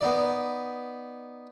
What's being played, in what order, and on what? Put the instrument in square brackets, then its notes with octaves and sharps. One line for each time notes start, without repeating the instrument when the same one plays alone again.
[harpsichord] B3 D#4 D5